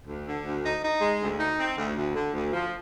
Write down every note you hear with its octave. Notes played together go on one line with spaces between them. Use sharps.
D2
D3
D2
D#4
D#4
G#3
D2
D#4
C4
D2
D2
D3
D2
F3